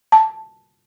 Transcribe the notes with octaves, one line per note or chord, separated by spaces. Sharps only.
A5